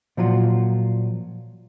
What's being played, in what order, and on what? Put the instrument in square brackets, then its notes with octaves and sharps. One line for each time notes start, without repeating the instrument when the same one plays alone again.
[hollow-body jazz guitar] A#2 F3 F#3 F4